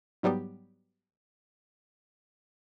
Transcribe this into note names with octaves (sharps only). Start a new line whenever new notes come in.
G#2 F#3 G3 B3 G4